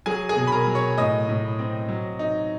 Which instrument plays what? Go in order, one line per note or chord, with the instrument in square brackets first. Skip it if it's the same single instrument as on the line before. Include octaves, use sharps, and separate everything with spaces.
[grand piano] F#3 G#4 G#5
G#4 G#5
B2
B5
A#4 A#5
F#3
C#5 C#6
A2 D#5 D#6
A2
C4
F#3
D#4